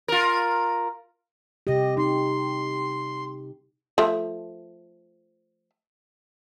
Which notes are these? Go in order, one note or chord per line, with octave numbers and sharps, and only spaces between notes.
F4 A#4
C3 G4 D#5
D#4 C6
F3 A3